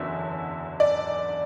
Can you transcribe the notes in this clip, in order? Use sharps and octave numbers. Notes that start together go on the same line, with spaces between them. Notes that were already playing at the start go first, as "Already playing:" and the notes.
Already playing: F#1 E2 D3 F#3 E5
D5